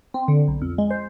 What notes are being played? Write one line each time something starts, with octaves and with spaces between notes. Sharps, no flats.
C4
D3
B1
F2
G#3
C5